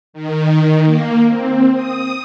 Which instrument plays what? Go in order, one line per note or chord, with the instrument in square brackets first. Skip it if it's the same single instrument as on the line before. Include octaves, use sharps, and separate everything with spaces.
[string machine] D#3
A#3
C4
D#6